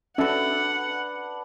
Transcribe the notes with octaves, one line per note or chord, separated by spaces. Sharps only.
C#4 D4 F#4 A4 B4 E5 F#5